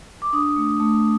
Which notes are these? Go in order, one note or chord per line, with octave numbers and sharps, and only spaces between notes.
D6
D4 D#6
A3
A3